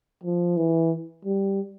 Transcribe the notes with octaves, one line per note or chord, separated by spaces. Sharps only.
F3
E3
G3